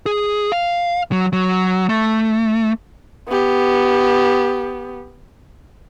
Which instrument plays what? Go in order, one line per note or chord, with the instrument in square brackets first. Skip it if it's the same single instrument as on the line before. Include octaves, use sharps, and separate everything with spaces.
[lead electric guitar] G#4
F5
F#3
F#3
A3
[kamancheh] B3 G4